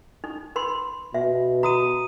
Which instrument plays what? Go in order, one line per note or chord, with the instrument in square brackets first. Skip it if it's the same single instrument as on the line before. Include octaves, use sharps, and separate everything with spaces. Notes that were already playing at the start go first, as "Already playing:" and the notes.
[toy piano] D#4
B4 B5 C6
[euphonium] B2 [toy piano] E5
[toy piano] F#4 [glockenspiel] A#5 D#6 D#7